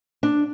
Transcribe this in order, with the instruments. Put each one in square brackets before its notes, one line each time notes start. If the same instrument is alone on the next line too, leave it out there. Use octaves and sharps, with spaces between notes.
[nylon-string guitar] D4